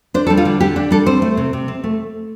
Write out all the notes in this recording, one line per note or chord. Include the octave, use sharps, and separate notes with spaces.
D4 C5
A4
G3
F4
D3
D3 G4
D4
G3 A4
C4 C5
A3
C3
C3
C4
A3